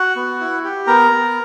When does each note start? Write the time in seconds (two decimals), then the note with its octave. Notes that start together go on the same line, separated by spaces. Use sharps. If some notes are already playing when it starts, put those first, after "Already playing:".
Already playing: F#4 F#5
0.16 B3
0.40 E4
0.64 G4
0.87 B3 A#4 A#5
1.11 B3